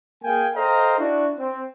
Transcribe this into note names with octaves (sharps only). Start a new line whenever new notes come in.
A#3 G#4 F5 G5 G#5
A4 C5 D#5 F5 G5 A#5
D4 E4 F#4
C4